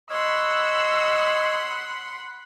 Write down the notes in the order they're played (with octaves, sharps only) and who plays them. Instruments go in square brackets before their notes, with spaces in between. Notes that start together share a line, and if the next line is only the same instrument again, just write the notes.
[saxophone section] C#5 D#5 [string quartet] F#5 B5 C6 [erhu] E6